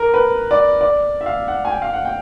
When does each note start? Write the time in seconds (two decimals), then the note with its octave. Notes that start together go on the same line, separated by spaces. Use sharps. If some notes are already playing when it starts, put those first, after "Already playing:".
Already playing: A#4
0.14 B4
0.51 D5
0.81 D5
1.21 E5
1.26 F5
1.48 F#5
1.65 G#5
1.70 G5
1.82 F5
1.93 F#5
2.05 G5